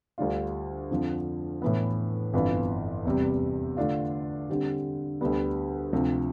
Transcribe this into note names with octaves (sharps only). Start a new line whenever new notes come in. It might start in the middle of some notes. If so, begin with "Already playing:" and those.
D2 D3 G3 D4 F4
F2 D3 F3
A2 E3 B3
G1 F2 E3 B3 F4
E2 C3 G3
D3 A3 D4 F4
D3 G3 C4 G4
D2 D3 G3 B3
D2 C3 F3